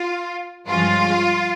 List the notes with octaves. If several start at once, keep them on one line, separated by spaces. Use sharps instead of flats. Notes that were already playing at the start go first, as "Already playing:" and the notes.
Already playing: F4
G2 F3 G#3 C#4 F4